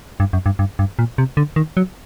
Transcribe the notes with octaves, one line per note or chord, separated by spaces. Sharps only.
G2
F#2
G2
G2
G2
A#2
C3
D3
D#3
F#3